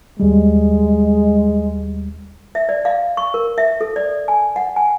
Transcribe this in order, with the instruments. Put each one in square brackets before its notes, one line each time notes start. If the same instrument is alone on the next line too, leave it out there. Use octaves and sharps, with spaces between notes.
[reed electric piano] D#2 G3 [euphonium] G#3
[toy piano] E5
D5
F5
C#6
A#4
E5
A4
D5
G#5
F#5
G#5